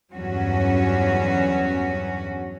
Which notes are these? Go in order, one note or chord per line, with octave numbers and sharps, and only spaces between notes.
E2 G2 F#3 C#4 F#4